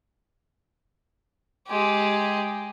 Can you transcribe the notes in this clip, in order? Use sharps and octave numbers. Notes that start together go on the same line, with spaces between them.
G#3 G4